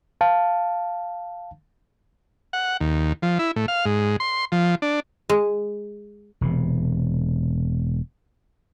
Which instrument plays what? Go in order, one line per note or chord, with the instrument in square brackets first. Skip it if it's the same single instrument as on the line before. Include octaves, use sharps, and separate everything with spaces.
[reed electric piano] F5 A5
[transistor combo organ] F#5
D#2
F3
E4
A2
F5
G#2
C6
F3
D4
[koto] G#3
[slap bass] E1 C3